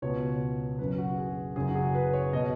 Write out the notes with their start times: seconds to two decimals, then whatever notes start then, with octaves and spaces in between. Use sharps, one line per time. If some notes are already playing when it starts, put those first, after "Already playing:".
0.02 C#2 B2 B3 C#5
0.79 F#1 F#2 C#3 B4
0.98 F#4
1.17 G#4
1.56 F#1 F#2 C#3 F#3 G#4
1.70 F#4
1.75 G#4
1.95 B4
2.13 C#5
2.33 B2 B3 D#5